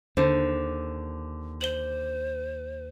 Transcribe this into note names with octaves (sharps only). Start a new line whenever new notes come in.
D#2 D3 C5
C5 F#7 G7